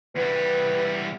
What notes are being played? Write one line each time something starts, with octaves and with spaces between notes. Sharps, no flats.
E2 G3 B4